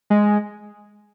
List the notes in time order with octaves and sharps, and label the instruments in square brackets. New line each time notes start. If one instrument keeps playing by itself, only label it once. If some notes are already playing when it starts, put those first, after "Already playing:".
[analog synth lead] G#3